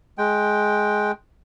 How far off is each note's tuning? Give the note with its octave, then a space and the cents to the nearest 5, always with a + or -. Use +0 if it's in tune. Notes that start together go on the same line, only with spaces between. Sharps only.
G#3 +15 G5 +0